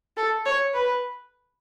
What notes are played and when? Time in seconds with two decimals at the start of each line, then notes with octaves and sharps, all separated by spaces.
0.17 A4
0.45 C#5
0.74 B4